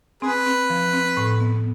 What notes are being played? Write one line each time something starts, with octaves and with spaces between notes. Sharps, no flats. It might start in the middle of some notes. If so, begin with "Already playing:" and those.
C4 G#4 B4
C4
F3
C4
A2
B3